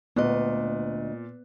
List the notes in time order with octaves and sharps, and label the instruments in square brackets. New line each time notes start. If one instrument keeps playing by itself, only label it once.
[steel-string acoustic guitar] D2 D#5 [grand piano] A#2 F#6 [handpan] B3